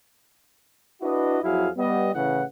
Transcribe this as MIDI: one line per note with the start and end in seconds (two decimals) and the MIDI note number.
1.02 1.38 62
1.02 1.38 64
1.02 1.38 66
1.02 1.38 71
1.02 1.38 75
1.43 1.69 41
1.43 1.69 54
1.43 1.69 64
1.43 1.69 66
1.43 1.69 68
1.43 1.69 77
1.77 2.11 55
1.77 2.11 59
1.77 2.11 75
2.14 2.43 45
2.14 2.43 49
2.14 2.43 52
2.14 2.43 71
2.14 2.43 78